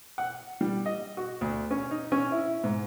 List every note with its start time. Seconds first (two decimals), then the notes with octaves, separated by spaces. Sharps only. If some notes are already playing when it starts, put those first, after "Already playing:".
0.18 F#5
0.61 G3
0.86 D#5
1.17 F#4
1.41 D2
1.71 C#4
1.91 D#4
2.12 C#4
2.32 E4
2.64 G#2